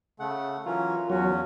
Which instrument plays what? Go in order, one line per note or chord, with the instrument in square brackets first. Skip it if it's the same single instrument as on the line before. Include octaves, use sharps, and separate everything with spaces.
[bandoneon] C#3 F#5 [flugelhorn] A3
[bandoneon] E3 F#3 C#4 [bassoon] F4 [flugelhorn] A#4
[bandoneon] E2 C#4 [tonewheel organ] F#3 [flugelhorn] F#4